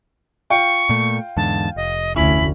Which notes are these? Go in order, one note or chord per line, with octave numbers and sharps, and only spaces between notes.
F4 G5 C#6
A#2 A3
E2 G#2 D3 A5
F1 D#5
D2 C#4 E4 B5